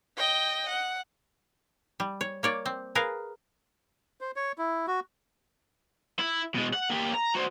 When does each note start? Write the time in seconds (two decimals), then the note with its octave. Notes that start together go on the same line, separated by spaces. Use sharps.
0.17 D#5 G5
0.68 F#5
2.00 G3
2.21 C#5
2.43 A#3 C#5 D5
2.66 C4
2.95 G#4 A#4 B4 F5
4.21 C5
4.36 C#5
4.58 E4
4.87 F#4
6.19 E4
6.55 B2 G#3
6.73 F#5
6.90 A#3 G4
7.14 A#5
7.35 F#4 C5